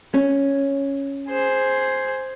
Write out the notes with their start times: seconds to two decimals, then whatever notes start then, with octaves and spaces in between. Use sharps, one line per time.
0.14 C#4
1.29 G#4 C5